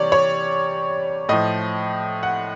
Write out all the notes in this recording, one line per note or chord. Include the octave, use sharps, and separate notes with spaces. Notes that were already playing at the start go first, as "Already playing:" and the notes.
Already playing: C3 E3 G3 C#5 D5
C#5
A2 F3 D#5
F#5